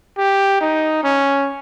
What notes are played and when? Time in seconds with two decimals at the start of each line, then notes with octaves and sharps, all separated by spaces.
0.18 G4
0.61 D#4
1.04 C#4